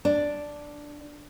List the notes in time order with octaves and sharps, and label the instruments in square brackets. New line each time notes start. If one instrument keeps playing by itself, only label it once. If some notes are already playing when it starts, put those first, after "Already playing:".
[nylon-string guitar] D4